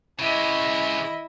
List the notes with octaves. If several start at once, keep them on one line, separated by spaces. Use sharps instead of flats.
C#3 G#3 E4 D#5